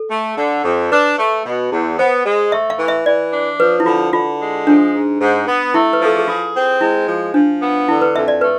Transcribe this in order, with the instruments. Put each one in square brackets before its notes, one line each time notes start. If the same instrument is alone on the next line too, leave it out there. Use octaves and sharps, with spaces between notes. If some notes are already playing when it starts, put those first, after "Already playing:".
Already playing: [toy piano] A4
[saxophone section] A3
D3
F2
[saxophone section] D4 [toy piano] B4
[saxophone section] A3
B2
E2
[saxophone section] B3 [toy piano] C5
[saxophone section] G#3
[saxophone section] A3 [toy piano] E5
[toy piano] F5
[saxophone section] E3
[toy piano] E5
[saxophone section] E3 [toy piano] D5
[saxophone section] D4
[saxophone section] F3 [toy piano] B4
[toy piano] E4
[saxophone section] D3 [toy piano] F4
[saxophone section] D3 [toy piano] F4
[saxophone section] G#3
[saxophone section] F3 [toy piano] D4
[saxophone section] G#2
G#2
B3
[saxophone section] A3 [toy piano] E4
[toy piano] B4
[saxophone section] F3 [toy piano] A4
[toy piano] G#4
[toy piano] F4 [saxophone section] G#4
[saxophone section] C4
[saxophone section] G#3 [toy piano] E4
[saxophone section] F3
[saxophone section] F3 [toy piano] D4
[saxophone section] B3
[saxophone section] D3 [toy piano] E4
[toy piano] B4
[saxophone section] F2 [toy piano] E5
[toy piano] D5
[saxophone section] A3 [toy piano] B4